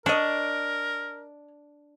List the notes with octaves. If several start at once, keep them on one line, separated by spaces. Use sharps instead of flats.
D4 A#4 C#5 D#5